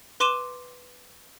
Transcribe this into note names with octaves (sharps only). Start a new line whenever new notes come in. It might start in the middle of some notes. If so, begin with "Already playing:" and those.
B4 C6 D6 D#7 E7 G7